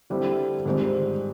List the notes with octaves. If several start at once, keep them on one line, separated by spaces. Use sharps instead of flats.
D3 G3 C4 E4
G#2 D#3 G3 C4